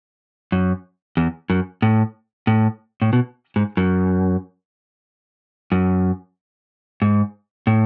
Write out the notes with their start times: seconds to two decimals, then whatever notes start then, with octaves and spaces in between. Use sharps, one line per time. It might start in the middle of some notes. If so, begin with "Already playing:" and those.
0.52 F#2
1.17 E2
1.50 F#2
1.82 A2
2.47 A2
3.02 A2
3.13 B2
3.56 G#2
3.77 F#2
5.72 F#2
7.02 G#2
7.67 A2